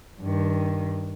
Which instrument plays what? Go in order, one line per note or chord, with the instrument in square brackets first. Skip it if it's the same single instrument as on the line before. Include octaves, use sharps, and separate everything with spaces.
[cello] G2 D#3